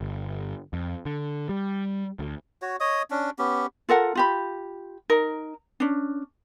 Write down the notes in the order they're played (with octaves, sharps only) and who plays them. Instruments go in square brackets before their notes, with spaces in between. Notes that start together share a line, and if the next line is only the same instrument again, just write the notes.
[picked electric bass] G1
F2
D3
G3
D2
[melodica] F#4 C#5
C#5 D#5 D#6
C#4 D4
B3 C#4 G4
[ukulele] F4 A4 A#4 F#5
F4 G4 B5
D#4 A#4
C#4 D4